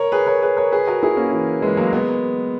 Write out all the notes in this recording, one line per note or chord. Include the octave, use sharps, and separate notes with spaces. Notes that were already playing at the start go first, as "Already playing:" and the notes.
Already playing: A#4 C#5
G#4 B4
A#4 C#5
G#4 B4
A#4 C#5
G#4 B4
F#4 A#4
E4 G#4
A#3 C#4
E3
E3 G#3
F#3 A#3
G#3 B3